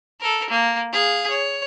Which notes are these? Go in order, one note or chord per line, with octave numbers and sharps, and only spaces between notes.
A4 A#4
A#3
G#4 F5
C#5